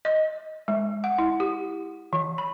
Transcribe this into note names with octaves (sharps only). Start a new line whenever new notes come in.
D#5
G#3
F#5
E4
G4
E3
B5